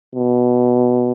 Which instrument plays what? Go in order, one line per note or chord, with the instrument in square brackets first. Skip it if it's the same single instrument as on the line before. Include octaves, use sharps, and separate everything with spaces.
[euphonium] B2